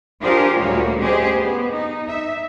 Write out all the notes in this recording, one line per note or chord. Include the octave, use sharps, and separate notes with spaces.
D4 F4 G4 G#4 A#4 C5
D2 A#2 G3 A#3 F#4 C#5
C#4 G4 G#4 C5 D#5
B3
D#4
E5